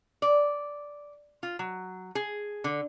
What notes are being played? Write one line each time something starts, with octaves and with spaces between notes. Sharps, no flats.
D5
F4
F#3
G#4
D3